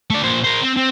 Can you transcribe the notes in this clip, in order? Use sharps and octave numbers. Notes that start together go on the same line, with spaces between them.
A3 D5
A#2 C5
A#4 C5
C4
C4